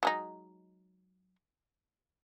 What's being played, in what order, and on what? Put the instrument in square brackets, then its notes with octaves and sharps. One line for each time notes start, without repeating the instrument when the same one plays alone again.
[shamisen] F#3 G#3 D#4